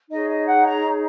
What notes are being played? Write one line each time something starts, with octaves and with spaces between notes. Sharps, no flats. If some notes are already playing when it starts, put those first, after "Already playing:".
D#4 G#4 C#5 D#5
D#5
F#5
A#5